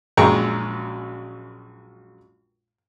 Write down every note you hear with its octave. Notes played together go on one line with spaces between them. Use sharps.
A#1 F#2 G#3 G5 A#5 C#6